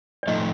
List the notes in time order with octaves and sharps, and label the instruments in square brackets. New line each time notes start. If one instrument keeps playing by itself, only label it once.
[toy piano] D5
[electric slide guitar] A2 F3 A3 D#4 [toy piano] D#5